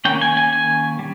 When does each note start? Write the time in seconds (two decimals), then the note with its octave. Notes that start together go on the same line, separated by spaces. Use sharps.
0.05 D#3 A#3 C#4 G5
0.21 G#5
0.37 G#5
0.53 G#5
0.99 G3